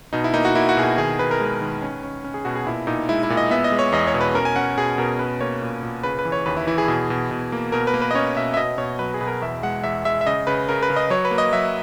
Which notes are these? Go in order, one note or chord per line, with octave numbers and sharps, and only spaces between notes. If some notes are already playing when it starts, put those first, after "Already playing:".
B2 D#4
E4
A#3 D#4
F#4
A#3 E4
F#4
B2 G#4
F#4
D#3 G#4
D#3 B4
A#4
G#3 B4
D#3
C#4
C#4
C#4
G#4
B2 F#4
G#4
A#2 E4
A#2 D#4
G#3 E4
E4
A#2
D#5
B3 E5
D#5
G#3
C#5
E2 D#5
C#5
B2
B4
C#4 A#4
G#5
C#4 F#5
B2 G#4
B2 A#4
C#4 B4
A#3 C#5
A#2
A#2
C#3 B4
B4
E3
C#5
D#2 B4
E4
E3 E4
G#4
B2
B2
B2
A#3
B2 A#4
B4
A#3
B4
D#5
C#4 C#5
B2 E5
E5
B2 D#5
B2 C#5
F#3 B4
G#4
B2 B4
A#4
E2 E5
G#3 F#5
E2 E5
G#3 E5
E5
C#3 D#5
C#3 B4
C#3 A#4
B4
C#3
D#5
F#3 C#5
B4
A#3
D#5
F#3 E5